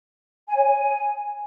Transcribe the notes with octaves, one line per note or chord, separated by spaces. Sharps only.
G#5
C#5
G#5